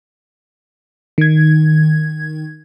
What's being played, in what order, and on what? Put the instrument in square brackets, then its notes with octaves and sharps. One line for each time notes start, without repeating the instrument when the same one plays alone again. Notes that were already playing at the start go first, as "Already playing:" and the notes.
[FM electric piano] D#3 G#6